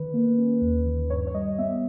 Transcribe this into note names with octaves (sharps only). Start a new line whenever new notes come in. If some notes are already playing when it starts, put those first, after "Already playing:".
Already playing: D#3 B4
A#3
C#4
D#2
D#3
G2 C#5
C#5
G3 D#5
B3 E5